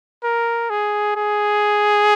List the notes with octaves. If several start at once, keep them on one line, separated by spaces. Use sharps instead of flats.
A#4
G#4
G#4